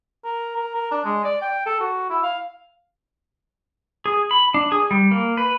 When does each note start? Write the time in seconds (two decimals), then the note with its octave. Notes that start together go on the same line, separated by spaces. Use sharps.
0.24 A#4
0.56 A#4
0.75 A#4
0.91 D4
1.04 G#3
1.24 D5
1.41 G5
1.66 A4
1.80 F#4
2.10 E4
2.23 F5
4.06 G#4
4.31 B5
4.54 D4
4.72 G#4
4.91 G3
5.11 A#3
5.37 B4